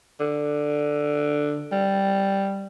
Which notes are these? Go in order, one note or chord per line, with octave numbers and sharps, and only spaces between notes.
D3
G3